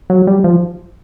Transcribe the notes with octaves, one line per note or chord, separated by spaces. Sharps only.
F#3
G3
F3